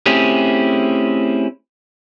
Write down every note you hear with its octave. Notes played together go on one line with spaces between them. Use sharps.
A3 C4 C#4 E4 G4 G#4